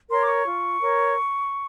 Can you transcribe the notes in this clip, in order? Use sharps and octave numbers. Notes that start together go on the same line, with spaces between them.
A#4 C#5 C6
D6
C#6
F4
A#4 C#5